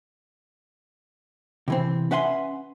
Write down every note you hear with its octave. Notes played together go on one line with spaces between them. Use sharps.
C3 E3 C4
C#4 B4 E5 F#5 G#5 C6